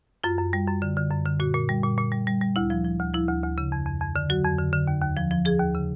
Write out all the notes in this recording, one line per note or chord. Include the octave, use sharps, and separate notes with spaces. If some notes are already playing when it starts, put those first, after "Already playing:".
F#2 F4
F#2
G3
F#2
D3
D3
F#2
D3
A#2 F#4
A#2
G3
A#2
A#2
G3
G3
G3
D2 E4
F3
F3
D2
F3 E4
D2
D2
C#3
F2
F2
F2
D3
F#3 F#4
F2
D3
D3
D#2
D#2
F3
F3
F3 G#4
D#2
C#3